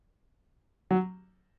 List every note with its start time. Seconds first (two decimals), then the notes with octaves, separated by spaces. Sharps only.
0.91 F#3